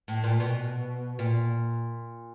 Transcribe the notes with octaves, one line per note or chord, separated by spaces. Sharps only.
A2
A#2
B2
A#2